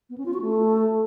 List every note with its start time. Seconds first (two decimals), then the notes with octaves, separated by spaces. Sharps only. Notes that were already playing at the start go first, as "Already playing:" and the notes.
0.10 B3
0.18 C#4
0.26 F4
0.34 F#4
0.42 A3